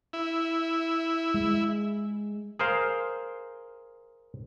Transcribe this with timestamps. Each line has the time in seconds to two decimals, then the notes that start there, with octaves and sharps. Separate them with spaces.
0.13 E4
1.34 G#3
2.59 G#4 A#4 C5 F5